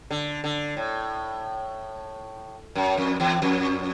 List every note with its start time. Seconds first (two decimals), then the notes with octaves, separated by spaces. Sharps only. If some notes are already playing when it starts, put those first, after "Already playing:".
0.11 D3
0.44 D3
0.77 A2
2.75 F#2
2.97 F2
3.20 E2
3.42 F2